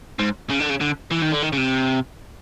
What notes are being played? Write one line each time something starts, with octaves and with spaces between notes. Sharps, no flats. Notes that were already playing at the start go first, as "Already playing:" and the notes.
G#2
C#3
D3
C#3
D3
E3
D#3
D3
D#3
C#3
C3